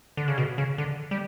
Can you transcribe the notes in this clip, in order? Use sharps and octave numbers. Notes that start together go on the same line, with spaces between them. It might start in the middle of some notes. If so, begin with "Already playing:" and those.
D3
C#3
B2
C#3
D3
G3